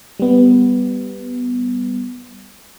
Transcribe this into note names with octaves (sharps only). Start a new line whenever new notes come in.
G3 B3